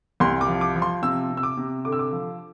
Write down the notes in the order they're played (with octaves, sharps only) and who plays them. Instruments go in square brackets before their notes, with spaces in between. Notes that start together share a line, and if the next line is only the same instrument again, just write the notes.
[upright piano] C2 C6
D6
F3
D6
F3
C6
C3 E6
C3
E6
D6
C3
D3 D6
E6
D6
F3